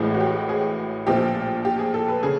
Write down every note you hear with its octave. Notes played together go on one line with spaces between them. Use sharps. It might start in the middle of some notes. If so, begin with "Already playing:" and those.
Already playing: A1 A2 E3 G#3 G#4
F#4
G4
G#4
A#1 A#2 F3 A3 G4
G4
G#4
A4
B4
C#3 G#4